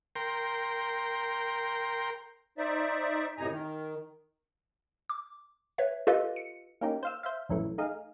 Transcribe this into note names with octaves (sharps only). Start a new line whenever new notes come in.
A#4 G5 C6
D#4 C5 D5 E5
F#2 A2 C3 D#4 G#5 A#5
D#3
D6
B4 C#5 E5
F4 G4 A4 B4 D#5 F5
C#7
A#3 C#4 D#4 G4
C5 F5 E6
C5 E5 F5
A#1 F#2 E3 A3
A3 D#4 G#4 F5